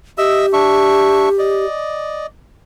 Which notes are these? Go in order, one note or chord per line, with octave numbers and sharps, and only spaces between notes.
G4 D#5 E5 E6
D4 E5 C#6
D5 D#5